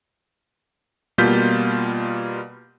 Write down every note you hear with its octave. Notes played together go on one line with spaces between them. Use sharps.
B2 G3 A#3 F4 G6 B6